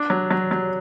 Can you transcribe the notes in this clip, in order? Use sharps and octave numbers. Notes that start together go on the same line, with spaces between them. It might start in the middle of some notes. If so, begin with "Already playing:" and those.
Already playing: D4
F#3
F#3
F#3